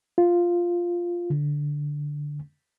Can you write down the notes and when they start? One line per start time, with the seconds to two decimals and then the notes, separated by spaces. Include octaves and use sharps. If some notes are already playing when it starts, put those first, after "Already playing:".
0.18 F4
1.30 D3